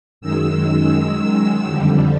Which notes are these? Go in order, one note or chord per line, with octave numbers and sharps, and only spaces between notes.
F#2 D#3 G#3 E6
F2 D3 G3